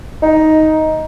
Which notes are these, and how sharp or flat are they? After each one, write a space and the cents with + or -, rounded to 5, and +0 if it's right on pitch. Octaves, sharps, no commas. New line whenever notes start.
D#4 +10